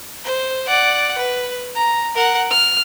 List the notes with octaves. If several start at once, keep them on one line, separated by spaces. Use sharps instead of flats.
C5
D5 F#5
B4
A#5
A#4 F#5
F6